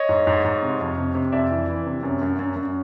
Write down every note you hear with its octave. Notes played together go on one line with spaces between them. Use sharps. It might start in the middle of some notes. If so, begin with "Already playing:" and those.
Already playing: C#5 D#5
G#2
G#2
G#2
C3
F2
C3
C3
F2 D5 E5
E3
E3
C3
F#2
F#2
F#2
F#2